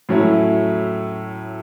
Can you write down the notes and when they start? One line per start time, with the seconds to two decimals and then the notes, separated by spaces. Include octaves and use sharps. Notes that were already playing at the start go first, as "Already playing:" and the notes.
0.09 A2 F#3 C#4 E4